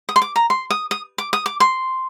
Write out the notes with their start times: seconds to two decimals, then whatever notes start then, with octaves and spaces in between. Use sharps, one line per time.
0.09 D#6
0.16 C6
0.22 D6
0.36 A#5
0.50 C6
0.70 D#6
0.91 D#6
1.18 D6
1.33 D#6
1.46 D6
1.60 C6